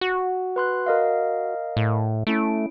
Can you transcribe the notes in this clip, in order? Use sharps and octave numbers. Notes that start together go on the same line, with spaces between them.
F#4
B4 C6 F#6
A#4 D#5 F5
A2
A3 C#4 E4 D7